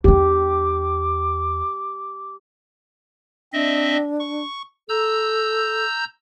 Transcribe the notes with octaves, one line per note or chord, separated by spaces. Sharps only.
E2 D4 G4 D6
C4 D4 D#5 E5
C#6
A4 A#5 E6 G6